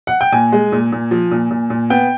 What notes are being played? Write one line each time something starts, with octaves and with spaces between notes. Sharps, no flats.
F#5
G5
A#2 G#5
G#3
A#2
A#2
F3
A#2
A#2
A#2
B3 G5